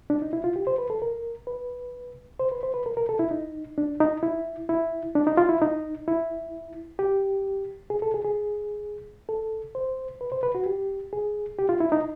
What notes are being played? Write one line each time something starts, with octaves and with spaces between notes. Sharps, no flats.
D4
D#4
E4
F4
G4
C5
B4
A4
A#4
B4
C5
B4
C5
B4
A#4
A#4
A4
E4
D#4
D4
D#4
E4
E4
D4
D#4
F4
E4
D#4
E4
G4
G#4
A4
G#4
G#4
A4
C5
B4
C5
B4
F#4
G4
G#4
G4
F4
E4
D#4